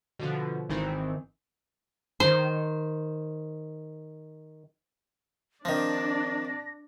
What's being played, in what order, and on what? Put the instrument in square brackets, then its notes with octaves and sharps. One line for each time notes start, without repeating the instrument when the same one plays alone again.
[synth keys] B2 D3 F3
G#1 D#3 E3 C4
[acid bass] D#3 [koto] C5
[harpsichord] D#3 F3 [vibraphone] C4 [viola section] D4 D5 [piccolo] A#6